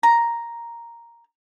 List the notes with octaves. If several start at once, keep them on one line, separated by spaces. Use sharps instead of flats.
A#5